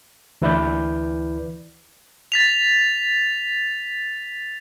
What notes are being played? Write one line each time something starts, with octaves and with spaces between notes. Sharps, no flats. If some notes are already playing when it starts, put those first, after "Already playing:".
D2 E3 E4 B4 D5 G6
A6 B6 F7